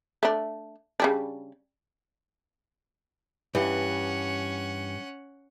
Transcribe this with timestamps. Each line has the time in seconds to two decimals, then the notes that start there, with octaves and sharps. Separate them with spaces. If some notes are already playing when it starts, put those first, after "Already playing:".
0.23 A3 D4
1.00 C#3 G3 D4
3.55 G2 E3 C#4 F#5